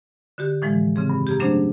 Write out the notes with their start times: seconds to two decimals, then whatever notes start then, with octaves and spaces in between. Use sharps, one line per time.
0.38 D3 F#4 G4
0.62 A2 E3 F3 G#3
0.96 C#3 C4 G#4
1.10 G2
1.27 G4 G#4 A#5
1.40 F#3 A3 C#4 D4 G#4 C5